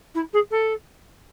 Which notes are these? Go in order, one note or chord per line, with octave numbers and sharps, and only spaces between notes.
E4
G#4
A4